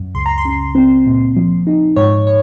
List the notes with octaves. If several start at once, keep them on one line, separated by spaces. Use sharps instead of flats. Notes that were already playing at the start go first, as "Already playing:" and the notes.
Already playing: F#2
C#2 C6
A#5
C6
C#3
C4
A#2
F3
D#4
G#2 C#5
C#5